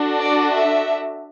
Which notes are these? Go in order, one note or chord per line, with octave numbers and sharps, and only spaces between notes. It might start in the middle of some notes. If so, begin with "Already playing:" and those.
Already playing: D4 F#4 A4
D5
E5